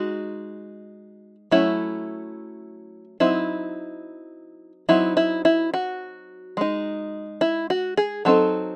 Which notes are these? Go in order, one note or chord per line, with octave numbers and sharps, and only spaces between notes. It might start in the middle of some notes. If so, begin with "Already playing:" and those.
Already playing: G#3 D#4 F#4
F#3 A3 C#4 E4
F#3 C4 D#4 E4
F#3 C4 D#4 E4
E4
E4
F#4
G#3 D#4
E4
F#4
G#4
F#3 C4 D#4 A4